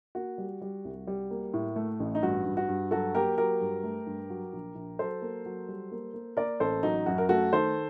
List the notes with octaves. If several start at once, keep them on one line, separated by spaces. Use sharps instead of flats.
A#3 F#4
G3
G3
C2
G3
A#3
A2
A3
A1
D#4
G2 F#4
G2
F#4
G2
F#3 F#4 A4
A#3 G4 A#4
F#3 G4 A#4
G2
A3
G2
F#3
A#1
A#1
F#3 A4 C5
A#3
F#3
G3
A#3
A#3
A#3 A#4 D5
A1 A4 C5
F#3 D#4
F#2 F#4
A#4
A3 F#4 A4
D#3 A4 C5